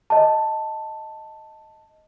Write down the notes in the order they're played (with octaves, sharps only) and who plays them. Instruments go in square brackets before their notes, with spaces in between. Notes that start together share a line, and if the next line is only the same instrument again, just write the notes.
[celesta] D#5 A5